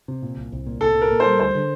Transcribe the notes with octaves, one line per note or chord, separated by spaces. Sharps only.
C3
A#2
C2
C2
A#2
C2 A4
A#2
A#4
A#2
C5
G3
D2 C5
D3